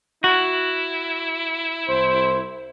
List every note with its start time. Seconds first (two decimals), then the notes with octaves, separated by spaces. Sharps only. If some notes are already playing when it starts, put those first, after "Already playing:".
0.24 E4 F#4
1.87 C2 C5